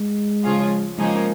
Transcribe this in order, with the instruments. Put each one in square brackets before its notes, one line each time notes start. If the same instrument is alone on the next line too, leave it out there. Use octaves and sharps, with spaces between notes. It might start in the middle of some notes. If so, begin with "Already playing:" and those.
Already playing: [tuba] G#3
[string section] C#3 F3 C#4 F4 G#4
[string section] C#3 F3 A#3 D#4 G#4 [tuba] G#3